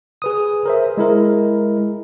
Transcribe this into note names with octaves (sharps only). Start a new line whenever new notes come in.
G#4 B4 D#6
A#4 C5 E5
G#3 E4 A#4